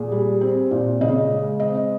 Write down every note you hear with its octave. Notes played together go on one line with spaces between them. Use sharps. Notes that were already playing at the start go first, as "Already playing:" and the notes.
Already playing: A#2 G#4
G3
C4
A#2
C#3 D#5
G#3
C4 D#5